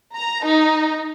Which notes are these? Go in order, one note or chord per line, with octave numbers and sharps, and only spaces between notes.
A#5
D#4